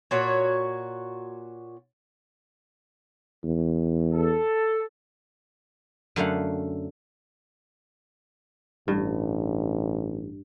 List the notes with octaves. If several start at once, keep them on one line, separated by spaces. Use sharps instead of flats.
A#2 F#4 C#5
E2
A4
F#2 D3 A3 F5 F#5
A1 G2